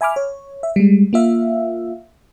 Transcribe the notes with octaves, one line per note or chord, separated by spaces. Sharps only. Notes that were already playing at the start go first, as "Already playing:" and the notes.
E5 G#5 B5 D6 F6
C#5
E5
G3 G#3
A#3 F4 E5 F5